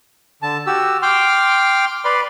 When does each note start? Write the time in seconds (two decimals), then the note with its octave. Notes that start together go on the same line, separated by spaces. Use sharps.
0.42 D3 A5
0.67 F#4 G4 E6
1.02 G5 C6 D6 F6
2.05 B4 D5 B5 C6